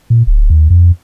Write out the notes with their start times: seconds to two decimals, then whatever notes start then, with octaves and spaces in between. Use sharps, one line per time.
0.10 A#2
0.27 D1
0.50 D#2
0.70 F2